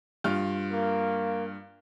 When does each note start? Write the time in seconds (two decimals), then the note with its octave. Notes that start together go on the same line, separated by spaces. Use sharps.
0.24 G2 F4 F6
0.72 A#3